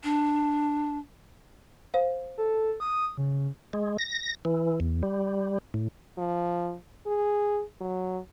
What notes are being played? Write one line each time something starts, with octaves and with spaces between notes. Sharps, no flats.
D4
C5 F5
A4
D#6
C#3
G#3
A#6
E3
E2
G3
A2
F3
G#4
F#3